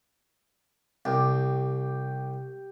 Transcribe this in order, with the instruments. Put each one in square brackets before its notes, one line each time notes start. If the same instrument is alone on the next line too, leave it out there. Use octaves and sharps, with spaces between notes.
[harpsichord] C2 [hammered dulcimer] G4 G5